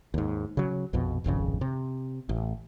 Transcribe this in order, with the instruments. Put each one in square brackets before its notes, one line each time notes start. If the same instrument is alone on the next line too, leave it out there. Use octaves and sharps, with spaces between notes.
[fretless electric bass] D#2 G#2
C#3 F#3
A#1 F2 B2
D1 G#1 F2 C#3
C3
A1